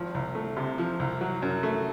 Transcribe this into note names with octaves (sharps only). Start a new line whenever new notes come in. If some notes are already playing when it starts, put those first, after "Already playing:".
Already playing: G#1 F3
C2
A3
C3
F3
C2
F#3
F#2
A3